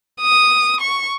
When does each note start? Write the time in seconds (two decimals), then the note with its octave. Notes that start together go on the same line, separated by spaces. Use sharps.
0.21 D#6
0.80 C#6